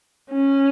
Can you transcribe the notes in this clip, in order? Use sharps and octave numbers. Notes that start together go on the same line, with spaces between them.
C#4